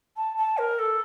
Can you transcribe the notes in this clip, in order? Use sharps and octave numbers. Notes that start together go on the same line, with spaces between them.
A5
A5
A#4
A4